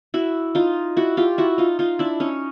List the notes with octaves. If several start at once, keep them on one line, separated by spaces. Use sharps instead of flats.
E4 F#4
D#4 F4
E4 F#4
F4 G4
E4 F#4
D#4 F4
D#4 F4
D4 E4
C#4 D#4